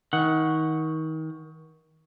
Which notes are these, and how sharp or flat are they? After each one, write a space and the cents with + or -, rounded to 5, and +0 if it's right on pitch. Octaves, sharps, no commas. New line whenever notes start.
D#3 +30 F#5 +0